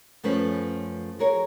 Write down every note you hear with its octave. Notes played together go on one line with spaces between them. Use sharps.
F#2 F3 A3 C#4 B4
F#4 G#4 A#4 C#5